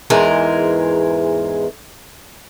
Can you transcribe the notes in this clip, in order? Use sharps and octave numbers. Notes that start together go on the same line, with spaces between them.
E2 G#2 E3 G#3 A#4